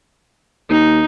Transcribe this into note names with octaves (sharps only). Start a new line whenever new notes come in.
D#2 D#4